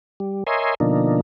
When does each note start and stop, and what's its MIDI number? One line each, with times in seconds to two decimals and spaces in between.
0.20 0.44 55
0.47 0.75 70
0.47 0.75 73
0.47 0.75 75
0.47 0.75 76
0.47 0.75 80
0.47 0.75 84
0.80 1.21 47
0.80 1.21 50
0.80 1.21 53
0.80 1.21 58
0.80 1.21 62
0.80 1.21 63